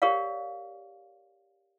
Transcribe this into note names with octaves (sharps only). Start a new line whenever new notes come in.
G4 A#4 C#5 D5 F5